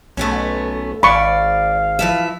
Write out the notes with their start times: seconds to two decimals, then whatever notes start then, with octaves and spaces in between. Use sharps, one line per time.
0.17 B1 A3 B3 C#4
1.03 G#1 D5 F5 B5 C#6
1.99 E3 F3 E5